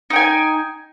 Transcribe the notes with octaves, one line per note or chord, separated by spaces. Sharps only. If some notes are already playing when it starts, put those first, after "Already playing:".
D#4 G5 G#5